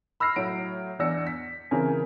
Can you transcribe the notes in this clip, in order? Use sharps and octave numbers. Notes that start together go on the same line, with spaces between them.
B5 E6 F6 A#6 C7
A2 F#3 D7
E2 D4 E6 A#6 C#7
B6
C#3 E3 C4 A#4 G#5